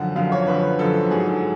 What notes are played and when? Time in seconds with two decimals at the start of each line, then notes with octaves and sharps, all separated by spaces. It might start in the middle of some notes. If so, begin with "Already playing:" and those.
Already playing: F#2 D3 F3 F#5
0.15 F#2 D3 F3 F5
0.32 C#5
0.47 F#2 D3 F3 B4
0.79 F#2 D3 F3 A4
1.11 G#2 F#3 G#4
1.27 A4